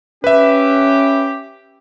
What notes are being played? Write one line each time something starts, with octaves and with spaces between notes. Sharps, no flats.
C#4 G4 B4 E5